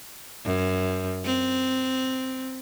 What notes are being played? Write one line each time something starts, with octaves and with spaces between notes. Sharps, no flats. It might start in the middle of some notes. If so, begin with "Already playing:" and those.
F#2
C4